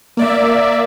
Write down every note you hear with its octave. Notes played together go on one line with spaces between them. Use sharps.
A#3 D5 E5